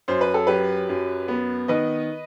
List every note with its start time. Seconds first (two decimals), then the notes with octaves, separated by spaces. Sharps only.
0.08 F#2 C5
0.21 B4
0.34 A4
0.47 F#3 G4 B4
0.89 F#2
1.28 B3
1.68 D#3 B4 D#5